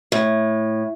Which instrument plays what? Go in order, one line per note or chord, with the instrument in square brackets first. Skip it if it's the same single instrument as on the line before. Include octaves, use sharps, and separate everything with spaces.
[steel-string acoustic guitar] A2